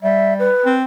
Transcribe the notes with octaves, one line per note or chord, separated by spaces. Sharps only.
G3 E5
B4
C4